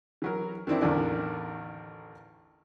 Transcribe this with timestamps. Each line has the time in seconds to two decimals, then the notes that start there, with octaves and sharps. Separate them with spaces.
0.22 E3 F#3 A#4
0.67 D#3 E3 C4 D4 E4
0.81 A1 E2 D3 D#3 D4 E4